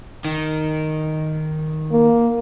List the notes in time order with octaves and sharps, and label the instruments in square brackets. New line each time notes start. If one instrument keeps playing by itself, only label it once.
[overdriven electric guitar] D#3
[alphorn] A#3